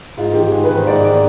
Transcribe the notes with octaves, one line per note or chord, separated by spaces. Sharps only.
G#2 F4
D#3 G4
G#2 G#4
B4
D#3
C5
G#2 D5
D#3 D5